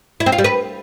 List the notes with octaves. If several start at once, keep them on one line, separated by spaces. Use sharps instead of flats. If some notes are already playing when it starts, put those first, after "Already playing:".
E4
C4
F4
G3
B4